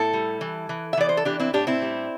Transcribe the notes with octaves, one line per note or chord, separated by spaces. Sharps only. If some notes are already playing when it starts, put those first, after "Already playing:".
Already playing: A2 E4 A4
G3
E3
E3
E5
E3 D5
C5
A4
E3 D4 G4
C4 E4
A2 D4 G4
C4 E4
G3